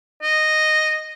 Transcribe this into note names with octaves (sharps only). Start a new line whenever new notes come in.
D#5